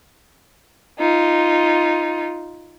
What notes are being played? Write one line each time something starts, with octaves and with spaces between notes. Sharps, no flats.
D#4 F4